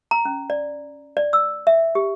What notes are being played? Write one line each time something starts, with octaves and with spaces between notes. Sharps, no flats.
A#5
C#4
D5
D5
E6
E5
G4